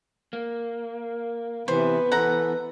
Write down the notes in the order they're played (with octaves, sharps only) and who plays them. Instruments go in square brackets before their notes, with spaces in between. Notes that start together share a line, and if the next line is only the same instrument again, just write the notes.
[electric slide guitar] A#3
[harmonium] C3 E3 [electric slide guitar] B3 [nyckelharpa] B4 [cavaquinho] C5
[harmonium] E3 A4 [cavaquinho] F#5 A#5